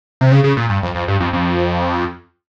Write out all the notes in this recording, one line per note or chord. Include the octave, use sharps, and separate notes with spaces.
C3
C#3
C#3
A#2
G2
F2
F2
G2
F2
F2